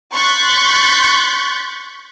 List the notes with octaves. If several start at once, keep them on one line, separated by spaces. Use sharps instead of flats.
C6 C#6 F#6 G6 A6 B6